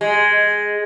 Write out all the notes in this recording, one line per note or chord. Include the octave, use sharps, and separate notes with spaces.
G#3